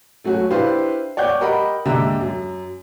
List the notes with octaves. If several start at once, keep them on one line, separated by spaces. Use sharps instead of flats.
F#3 A3 C#4 F#4
D4 E4 G4 B4 C5 F5
C#5 D5 F#5 G5 G6
G4 A#4 D#5 F#5 B5
D#2 G#2 D3 G4 E5 A#5
F#2